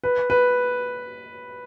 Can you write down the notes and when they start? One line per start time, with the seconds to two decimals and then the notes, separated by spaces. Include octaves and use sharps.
0.04 B4
0.30 B4